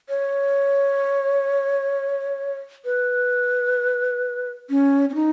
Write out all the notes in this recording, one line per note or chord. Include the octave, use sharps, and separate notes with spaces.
C#5
B4
C#4
C#4
D#4